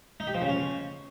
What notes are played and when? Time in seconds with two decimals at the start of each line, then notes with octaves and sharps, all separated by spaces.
0.20 D#4
0.27 G4
0.34 F3
0.42 C#3
0.49 C#4